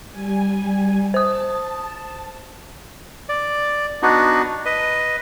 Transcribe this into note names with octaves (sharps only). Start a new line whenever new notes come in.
G3 G#5
C5 A5 D#6
D5
B3 D4 D#4 F#4
B4 D#5